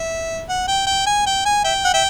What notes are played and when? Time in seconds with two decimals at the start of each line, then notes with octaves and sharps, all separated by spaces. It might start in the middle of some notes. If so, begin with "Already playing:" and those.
Already playing: E5
0.49 F#5
0.68 G5
0.87 G5
1.06 G#5
1.26 G5
1.45 G#5
1.64 E5 G5
1.85 F#5
1.94 E5 G5